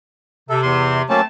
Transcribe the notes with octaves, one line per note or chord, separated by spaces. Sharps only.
C3 A4
E2 C6
F#3 A3 A#3 C4 C#4 A5